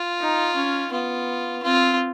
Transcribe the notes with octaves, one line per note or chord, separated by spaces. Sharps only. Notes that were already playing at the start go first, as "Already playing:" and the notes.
Already playing: F4
D#4
C#4
B3 F4
C4 F4